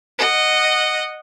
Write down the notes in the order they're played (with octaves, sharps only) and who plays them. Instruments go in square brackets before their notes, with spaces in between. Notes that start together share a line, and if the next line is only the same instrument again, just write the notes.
[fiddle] D#5 F#5